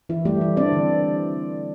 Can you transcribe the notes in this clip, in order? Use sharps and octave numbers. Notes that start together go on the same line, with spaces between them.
E3 E4
G3 A3 G4
E3
C4 D4 D5
D3